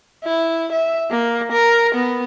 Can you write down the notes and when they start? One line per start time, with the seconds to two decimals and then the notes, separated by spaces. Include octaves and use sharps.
0.24 E4
0.72 E5
1.11 A#3
1.52 A#4
1.95 B3